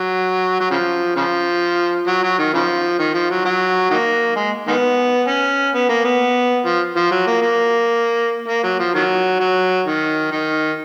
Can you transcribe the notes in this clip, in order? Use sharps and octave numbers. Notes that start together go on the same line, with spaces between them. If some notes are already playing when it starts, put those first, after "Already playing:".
Already playing: F#3
F#3
C#3 F3
C#3 F3
F#3
F#3
D#3
C#3 F3
D#3
F3
F#3
F#3
D#3 F#3 A#3
G#3
D#3 G#3 B3
C#4
B3
A#3
B3
F3
F3
F#3
A#3
A#3
A#3
F#3
F3
D#3 F#3
F#3
D#3
D#3